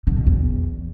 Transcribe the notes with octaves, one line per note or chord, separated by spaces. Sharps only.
D3
B2
E2